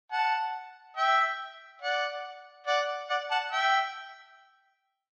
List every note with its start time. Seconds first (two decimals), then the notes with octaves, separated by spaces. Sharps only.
0.12 F#5 A5
0.97 E5 G5
1.82 D5 F#5
2.67 D5 F#5
3.09 D5 F#5
3.31 F#5 A5
3.52 E5 G5